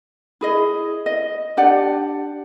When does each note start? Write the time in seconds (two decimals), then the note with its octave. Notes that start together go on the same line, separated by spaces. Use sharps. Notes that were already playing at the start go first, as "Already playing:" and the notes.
0.41 E4 G#4 D#5
1.06 D#5
1.57 D4 G4 D5 F#5